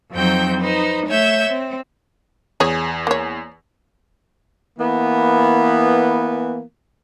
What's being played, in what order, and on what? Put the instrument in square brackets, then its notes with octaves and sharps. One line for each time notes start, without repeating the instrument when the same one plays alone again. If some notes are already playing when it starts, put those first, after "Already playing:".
[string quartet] F2 F#3 C4 D#4 G5 G6
D#4 B4 C5
A3 C#5 E5 G6
C4
[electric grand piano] E2 G#5 [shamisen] G#4 C#5
[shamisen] A#3 C#5
[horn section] E3 A#3 B3